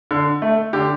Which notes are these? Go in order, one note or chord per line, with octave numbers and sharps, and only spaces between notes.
D3
A3
D3 G4